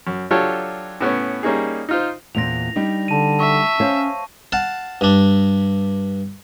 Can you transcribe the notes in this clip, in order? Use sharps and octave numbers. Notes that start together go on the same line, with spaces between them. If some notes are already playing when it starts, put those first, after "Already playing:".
F#2
F#3 D4 F4 G4 A4 C#5
A2 B3 C#4
G3 A#3 C#4 D#4 G#4
D#4 F4 C5
E2 A#2 C4 A#6 F7
G3 D4 D#4
D3 A5 D#7
E5 C#6
C#4 C5 C#5 F5
F5 F#5 A5
G2 D4